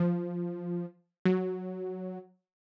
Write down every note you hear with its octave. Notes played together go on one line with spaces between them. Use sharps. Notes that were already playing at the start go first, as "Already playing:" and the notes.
Already playing: F3
F#3